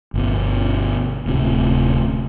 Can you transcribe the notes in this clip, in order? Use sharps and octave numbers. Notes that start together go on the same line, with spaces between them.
G1 B2
D1 A2 C3